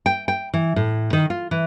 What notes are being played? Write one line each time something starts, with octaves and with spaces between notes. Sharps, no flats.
G5
G5
E3
A2
D#3
F4
E3